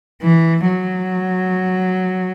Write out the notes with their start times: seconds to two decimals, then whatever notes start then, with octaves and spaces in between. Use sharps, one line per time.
0.22 E3
0.68 F#3